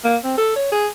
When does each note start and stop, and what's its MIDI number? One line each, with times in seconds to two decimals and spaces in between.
0.05 0.17 58
0.24 0.37 60
0.38 0.53 69
0.56 0.68 73
0.72 0.88 68